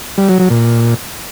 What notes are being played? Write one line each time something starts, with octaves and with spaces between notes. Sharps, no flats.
G3
F#3
F#3
A#2